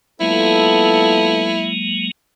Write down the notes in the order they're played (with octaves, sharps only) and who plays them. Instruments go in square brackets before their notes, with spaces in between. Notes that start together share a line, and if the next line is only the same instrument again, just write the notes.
[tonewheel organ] F#3 G#3 A#3 [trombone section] B3 F4 A4 [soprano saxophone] E4